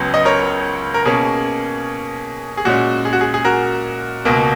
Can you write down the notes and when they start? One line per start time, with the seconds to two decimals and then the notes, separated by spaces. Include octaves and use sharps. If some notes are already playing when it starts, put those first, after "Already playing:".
Already playing: C#2 C#3 F#3 B3
0.14 D#5
0.25 A#4 C#5
0.94 A#4
1.05 B2 A#3 C#4 G#4
2.57 G#4
2.65 A#2 G#3 C#4 F#4
3.05 G#4
3.13 F#4
3.21 G#4
3.34 G#4
3.45 F#4 A#4
4.25 C#2 B2 A#3